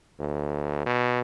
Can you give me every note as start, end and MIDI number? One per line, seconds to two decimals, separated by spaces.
0.20 0.82 38
0.86 1.21 47